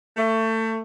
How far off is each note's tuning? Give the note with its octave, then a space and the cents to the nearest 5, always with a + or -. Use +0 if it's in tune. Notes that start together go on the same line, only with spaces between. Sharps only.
A3 +25